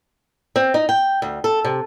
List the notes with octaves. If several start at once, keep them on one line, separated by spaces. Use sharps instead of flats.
C4
D#4
G5
D2
A4
C3